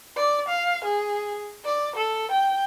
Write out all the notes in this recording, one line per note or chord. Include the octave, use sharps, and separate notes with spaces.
D5
F5
G#4
D5
A4
G5